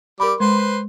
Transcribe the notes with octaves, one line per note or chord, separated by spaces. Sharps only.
G3 A#4 B5 D6
G#3 B4 C5 C6